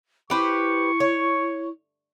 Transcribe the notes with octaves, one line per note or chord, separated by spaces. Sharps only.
E4 G4 B4 C5 C#6
C#5